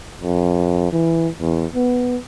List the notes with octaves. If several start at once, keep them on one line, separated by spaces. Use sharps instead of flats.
F2
E3
E2
B3